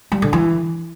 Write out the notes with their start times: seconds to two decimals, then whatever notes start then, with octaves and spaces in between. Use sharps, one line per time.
0.12 G3
0.22 D3
0.33 E3